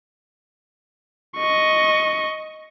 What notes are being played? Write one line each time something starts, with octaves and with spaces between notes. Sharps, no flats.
D#5 C#6